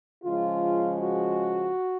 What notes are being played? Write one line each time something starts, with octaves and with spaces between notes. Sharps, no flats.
C#3 F3 G#3 F4
F#4